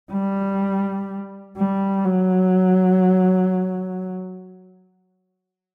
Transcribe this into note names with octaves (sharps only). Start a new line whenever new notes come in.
G3
G3
F#3